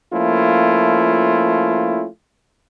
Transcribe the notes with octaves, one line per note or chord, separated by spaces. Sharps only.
F3 A3 A#3 C#4 E4 F4